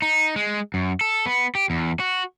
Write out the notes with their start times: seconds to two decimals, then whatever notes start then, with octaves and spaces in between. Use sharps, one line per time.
0.02 D#4
0.36 G#3
0.74 F#2
1.01 A4
1.26 B3
1.55 G4
1.70 E2
2.00 F#4